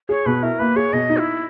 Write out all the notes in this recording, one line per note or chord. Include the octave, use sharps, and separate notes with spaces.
G#4 C#5
B2 B4
E4 A#4
A#3 B4
G#4 C#5
B2 D#5
D#4
E4